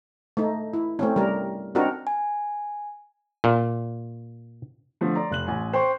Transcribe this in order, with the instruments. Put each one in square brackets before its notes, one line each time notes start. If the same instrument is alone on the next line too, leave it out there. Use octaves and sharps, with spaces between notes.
[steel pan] A3 D#4
E4
A3 C4 C#4
G3 A#4
C4 D4 D#4 F#4 A#4
[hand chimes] G#5
[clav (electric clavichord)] A#2
[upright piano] D3 F3 A3
D5 A#5 C6
F1 F#6 F#7
A1 G#5
C5 G5 C6 C#6